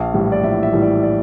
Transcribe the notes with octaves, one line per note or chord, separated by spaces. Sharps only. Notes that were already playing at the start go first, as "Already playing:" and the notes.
Already playing: A#1 F5
A2 E3 G3
D5
A#1 E5
E5
A2 E3 G3
D5
D5